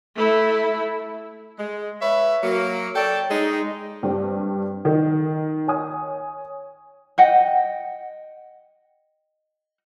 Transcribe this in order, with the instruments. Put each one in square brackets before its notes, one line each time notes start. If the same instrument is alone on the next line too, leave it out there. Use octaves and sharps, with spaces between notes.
[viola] A3 E4
[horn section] G#3
B4 C#5 E5
F#3 A#3
A4 C#5 D5 G5 A5
G#3 D#4
[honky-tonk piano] G2 G3 C4 G4
D#3 D#5
C#5 G#5 D#6
[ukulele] D#5 F#5 G5